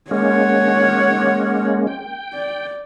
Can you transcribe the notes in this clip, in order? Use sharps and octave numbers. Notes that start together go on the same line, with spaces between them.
G#3 A#3 C#4 C#5 F#5
G5
D5